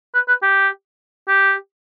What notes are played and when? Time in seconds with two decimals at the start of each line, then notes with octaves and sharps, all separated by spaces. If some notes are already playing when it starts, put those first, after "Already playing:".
0.14 B4
0.28 B4
0.42 G4
1.28 G4